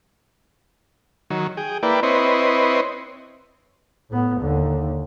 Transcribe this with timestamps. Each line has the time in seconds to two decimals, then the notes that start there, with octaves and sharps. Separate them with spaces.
1.30 D#3 F#3
1.57 G#4 G5
1.83 A#3 E4 B4 D5 G5
2.03 C4 E4 B4 C#5 D#5 C6
4.10 A2 B3
4.41 D#2 D3